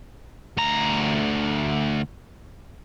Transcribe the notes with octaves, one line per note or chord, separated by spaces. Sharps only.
D2 A#5